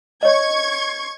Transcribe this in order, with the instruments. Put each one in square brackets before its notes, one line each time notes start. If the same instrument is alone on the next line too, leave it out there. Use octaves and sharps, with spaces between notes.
[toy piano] C#5 D#5 [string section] C#6 G#6